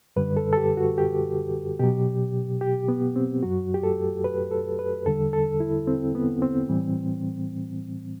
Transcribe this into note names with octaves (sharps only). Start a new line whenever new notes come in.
F#2 D3 G3 B4
A4
A4
G4
F#4
G4
B2 F#3 G4
G4
B3
C4
F#2 F#3 F#4
G4
A4
B4
A4
B4
E2 D3 G3 A4
A4
E4
C4
B3
C4
A2 E3 G3